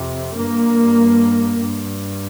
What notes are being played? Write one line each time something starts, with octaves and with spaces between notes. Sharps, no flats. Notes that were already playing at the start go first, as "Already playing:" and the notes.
Already playing: F2 C3
G2 A#3
G2